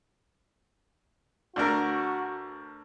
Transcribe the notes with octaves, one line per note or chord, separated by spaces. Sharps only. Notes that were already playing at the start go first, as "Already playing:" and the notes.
D2 D4 F#4 A#4